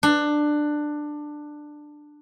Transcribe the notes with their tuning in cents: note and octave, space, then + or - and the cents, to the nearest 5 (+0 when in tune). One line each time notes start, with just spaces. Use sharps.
D4 +15